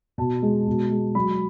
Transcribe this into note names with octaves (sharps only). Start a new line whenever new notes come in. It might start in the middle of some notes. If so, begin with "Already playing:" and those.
B2 A5
G#3
B2
G#3
F#3 B5